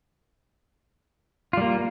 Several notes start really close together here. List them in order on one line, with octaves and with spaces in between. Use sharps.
F4 G3 A#3